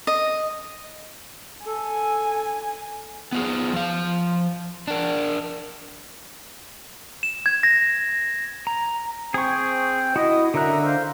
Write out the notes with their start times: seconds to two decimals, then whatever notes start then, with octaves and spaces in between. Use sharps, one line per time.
0.07 D#5
1.65 A4 G#5
3.32 B3 F4 G#4
3.73 F3 F5
4.88 D4 A#4
7.23 E7
7.46 G#6
7.63 A#6
8.67 A#5
9.34 C4 G#4 G5 C#6
10.16 E4 F#4 D#5
10.54 F#2 D3 E5 A#5 F#6
10.84 F4 C5 F5